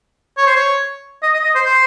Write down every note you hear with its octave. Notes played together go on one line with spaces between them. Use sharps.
C#5
C5
C#5
D#5
D#5
D#5
C5
C5